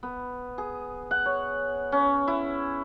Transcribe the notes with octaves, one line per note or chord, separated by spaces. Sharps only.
B3
G#4
F#5
C#5
C#4
E4